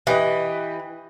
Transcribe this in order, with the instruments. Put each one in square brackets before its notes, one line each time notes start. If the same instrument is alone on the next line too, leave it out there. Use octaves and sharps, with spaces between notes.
[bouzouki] E3 [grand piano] G4 B4 D#5